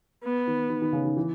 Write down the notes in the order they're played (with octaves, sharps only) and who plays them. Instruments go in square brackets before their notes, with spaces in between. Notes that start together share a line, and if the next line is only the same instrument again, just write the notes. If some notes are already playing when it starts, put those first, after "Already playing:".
[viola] B3
[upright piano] D#3
D#3
D#3
C#3
D#3
E3